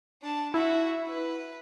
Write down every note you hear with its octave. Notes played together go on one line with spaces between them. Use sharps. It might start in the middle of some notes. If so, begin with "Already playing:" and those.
D4 A5
E4 F#4 E5
B4